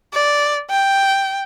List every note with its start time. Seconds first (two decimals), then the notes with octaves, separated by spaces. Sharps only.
0.14 D5
0.70 G5